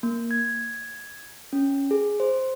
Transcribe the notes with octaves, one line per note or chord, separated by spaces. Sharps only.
A#3
G#6
C#4
G#4
C5